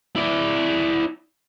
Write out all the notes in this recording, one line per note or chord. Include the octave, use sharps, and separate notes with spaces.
E4 D5